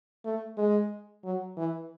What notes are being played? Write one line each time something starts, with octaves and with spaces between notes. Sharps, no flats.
A3
G#3
F#3
E3